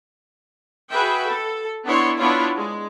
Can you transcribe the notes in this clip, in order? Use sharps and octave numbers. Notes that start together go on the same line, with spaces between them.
F#4 G#4 B4 E5 G5
A4
B3 D4 E4 C#5 C6
B3 D4 E4 F4 C#5
G#3